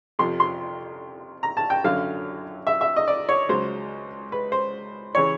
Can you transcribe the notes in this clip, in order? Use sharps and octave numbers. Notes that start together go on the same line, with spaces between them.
F2 C3 F3 C6
C6
A#5
A5
G5
F#2 D3 F#3 F5
E5
E5
D#5
D5
C#5
C#2 C#3 F#3 C5
B4
C5
C#3 E3 C#5